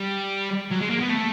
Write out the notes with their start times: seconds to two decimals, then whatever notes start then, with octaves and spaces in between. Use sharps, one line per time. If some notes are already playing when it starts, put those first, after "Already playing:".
Already playing: G3
0.71 F#3
0.82 G#3
0.91 A#3
1.01 B3
1.10 A3